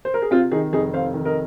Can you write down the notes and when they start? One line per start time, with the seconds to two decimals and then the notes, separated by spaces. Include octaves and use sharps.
0.05 C5
0.14 A#4
0.22 G#4
0.31 C3 C4 F4
0.52 D#3 D#4 G#4
0.73 F1 D#4 G#4
0.93 F1 C5 F5
1.14 D#3
1.25 A#4 D#5